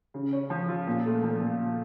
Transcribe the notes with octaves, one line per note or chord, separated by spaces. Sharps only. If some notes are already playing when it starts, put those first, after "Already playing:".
C#3
C#4
F3
F4
A#2
A3
F3
A#2